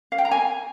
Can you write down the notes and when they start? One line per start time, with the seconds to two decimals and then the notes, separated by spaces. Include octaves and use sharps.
0.12 F5
0.18 G5
0.25 A#5
0.31 G#5